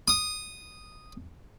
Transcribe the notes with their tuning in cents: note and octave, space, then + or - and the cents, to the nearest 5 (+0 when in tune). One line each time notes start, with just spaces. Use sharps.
D#6 -5